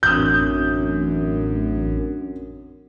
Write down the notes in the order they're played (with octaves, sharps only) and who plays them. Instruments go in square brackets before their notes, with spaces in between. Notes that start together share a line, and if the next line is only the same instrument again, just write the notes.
[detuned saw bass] A1 [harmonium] F#2 [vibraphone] C4 D4 F#4 [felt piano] D#6 G6